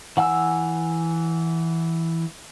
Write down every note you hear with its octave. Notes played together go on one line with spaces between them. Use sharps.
E3 F#5 G#5 E6